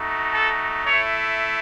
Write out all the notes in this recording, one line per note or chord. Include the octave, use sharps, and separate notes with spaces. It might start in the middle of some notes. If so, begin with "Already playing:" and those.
Already playing: A3 D#4 F#4
A4
A3 E4 C#5